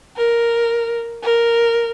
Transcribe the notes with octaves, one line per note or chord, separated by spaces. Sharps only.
A#4
A#4